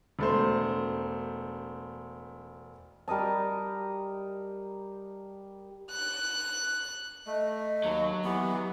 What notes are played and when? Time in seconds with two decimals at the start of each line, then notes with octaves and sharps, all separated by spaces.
0.19 E1 A3 C5
3.08 G3 A#4 D#5 A5
5.91 F#6
7.27 A3 D#5
7.84 D#2 F#3
8.24 E3 B3 G4